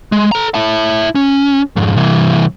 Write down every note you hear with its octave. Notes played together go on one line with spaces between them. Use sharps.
G#3
A4 A#5
E4 A5
C#4
F2 G#2
C2 E3